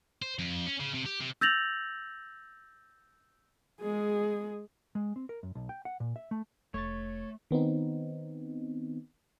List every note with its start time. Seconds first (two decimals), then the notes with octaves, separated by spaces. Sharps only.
0.22 C5
0.39 F2
0.66 C#4
0.80 C#3
0.94 C3
1.05 G4
1.20 C3
1.41 E6 G6 A6 A#6 F7 F#7
3.81 G#3 G#4
4.95 G#3
5.16 C4
5.29 A#4
5.43 F#2
5.55 B1
5.69 G5
5.85 F#5
6.00 A#2
6.16 E5
6.31 A3
6.74 F1 A3 C#5 C#6 A6
7.51 D#3 B3 C4 D#4